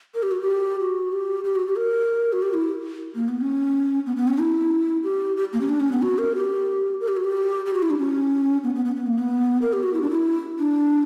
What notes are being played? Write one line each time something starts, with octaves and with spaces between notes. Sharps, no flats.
A#4
G4
F#4
G4
F#4
G4
G4
F#4
G4
A#4
F#4
G4
E4
A#3
B3
C#4
B3
B3
C#4
E4
G4
G4
A#3
C#4
D4
C#4
B3
F#4
A#4
G4
A#4
G4
F#4
G4
G4
F#4
E4
D4
C#4
B3
B3
B3
B3
A#3
B3
A#4
G4
F#4
E4
D4
E4
D4